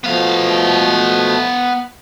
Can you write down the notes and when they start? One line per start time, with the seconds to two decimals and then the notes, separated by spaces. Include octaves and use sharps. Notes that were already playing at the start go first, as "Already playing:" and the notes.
0.04 B2 F3 A3 B3 F5